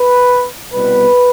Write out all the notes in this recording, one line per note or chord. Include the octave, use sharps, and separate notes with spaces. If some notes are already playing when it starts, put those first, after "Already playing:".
Already playing: B4
C2 B2 G3 B3 B4